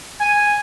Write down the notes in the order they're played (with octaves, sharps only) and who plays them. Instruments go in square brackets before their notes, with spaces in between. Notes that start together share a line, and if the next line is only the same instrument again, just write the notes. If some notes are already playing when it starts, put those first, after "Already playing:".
[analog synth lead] G#5